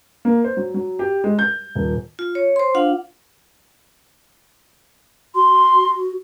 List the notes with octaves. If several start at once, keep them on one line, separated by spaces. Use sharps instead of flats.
A#3
C5
F#3
F#3
G4
G#3
G6
D#1
F4
C#5
C5 C6
D4 F4 F5 F#5
F#4 C6